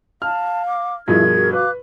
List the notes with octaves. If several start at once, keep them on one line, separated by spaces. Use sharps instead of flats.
F5 A5 F6
D6
G2 B2 F3 E4 G#4 A#4 G#6
F#4
B4 F5 D6 F#6